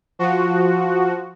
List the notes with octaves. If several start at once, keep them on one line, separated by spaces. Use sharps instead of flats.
F3 F#4